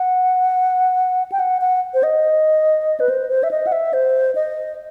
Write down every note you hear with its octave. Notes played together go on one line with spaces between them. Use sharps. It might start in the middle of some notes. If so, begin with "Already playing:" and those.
Already playing: F#5
G5
F#5
F#5
C5
D#5
B4
C5
C5
E5
D#5
F#5
E5
C5
D#5